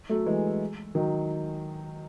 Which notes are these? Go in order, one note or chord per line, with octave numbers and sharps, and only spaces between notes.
F#3 A3
E3 G#3
D#3 F#3